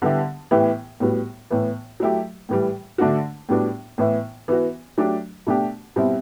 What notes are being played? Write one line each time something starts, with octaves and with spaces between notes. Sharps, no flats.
D3 G3 B3 E4 G4
A2 E3 B3 E4 G4
A2 G3 B3 F#4
A2 E3 B3
F#3 A3 E4 G4
A2 E3 G3
D3 A3 D4 F#4
A2 G3 B3 D4 F#4
A2 E3 B3 E4
E3 B3 F#4
F#3 A3 D4 G4
B2 A3 D4 G4
B2 G3 C4 E4